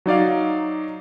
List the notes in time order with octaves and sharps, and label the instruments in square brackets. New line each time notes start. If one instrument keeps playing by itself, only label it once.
[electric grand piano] F#3 D#4 D5 F5